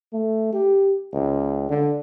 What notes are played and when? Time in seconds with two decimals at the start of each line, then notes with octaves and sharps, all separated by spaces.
0.13 A3
0.53 G4
1.13 C#2
1.69 D3